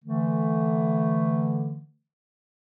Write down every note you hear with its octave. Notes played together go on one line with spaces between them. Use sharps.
D3 E3 A3